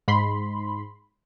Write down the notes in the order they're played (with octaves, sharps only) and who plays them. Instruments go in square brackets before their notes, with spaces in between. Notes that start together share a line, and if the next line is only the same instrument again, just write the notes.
[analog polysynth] G#2 B5 C6